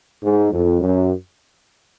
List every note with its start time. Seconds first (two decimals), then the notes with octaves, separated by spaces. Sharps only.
0.21 G#2
0.51 F2
0.80 F#2